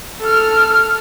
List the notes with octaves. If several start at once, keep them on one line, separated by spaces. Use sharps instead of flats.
A4 F6